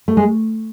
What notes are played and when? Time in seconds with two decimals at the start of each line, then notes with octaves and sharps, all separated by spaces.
0.08 A3
0.17 G#3